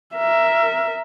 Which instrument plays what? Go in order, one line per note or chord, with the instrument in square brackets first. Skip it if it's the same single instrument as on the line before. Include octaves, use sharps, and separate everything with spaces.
[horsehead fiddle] A#4 E5